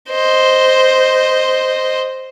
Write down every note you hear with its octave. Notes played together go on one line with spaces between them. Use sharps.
C5 D#5